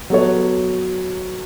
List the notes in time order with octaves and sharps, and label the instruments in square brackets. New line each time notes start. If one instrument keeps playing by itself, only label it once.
[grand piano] F#3 B3 F#4 A4 C#5